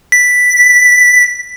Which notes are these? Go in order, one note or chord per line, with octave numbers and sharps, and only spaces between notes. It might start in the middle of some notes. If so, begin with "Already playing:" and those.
B6